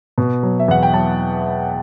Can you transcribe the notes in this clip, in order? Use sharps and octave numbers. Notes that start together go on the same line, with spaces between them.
B2
F#3
E5
E2 F#5
G5
F#3 A5